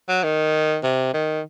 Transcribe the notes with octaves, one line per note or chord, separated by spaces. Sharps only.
F#3
D#3
C3
D#3